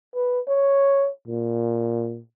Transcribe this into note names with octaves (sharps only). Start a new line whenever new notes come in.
B4
C#5
A#2